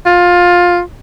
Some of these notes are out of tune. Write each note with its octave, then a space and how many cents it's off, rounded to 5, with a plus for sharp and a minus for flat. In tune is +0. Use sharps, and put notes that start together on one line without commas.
F4 +15